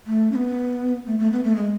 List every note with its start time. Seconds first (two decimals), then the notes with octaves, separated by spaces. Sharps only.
0.07 A3
0.32 C#4
0.35 B3
1.07 A3
1.19 A3
1.32 B3
1.44 A3
1.56 G#3